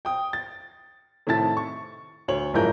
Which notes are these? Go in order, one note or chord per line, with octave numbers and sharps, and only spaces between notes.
G5 D#6
A6
A2 C3 D#3 E4 A5 A6
C#6
D2 C#5 F#7
F#1 G#2 F3 E4 A#4 G6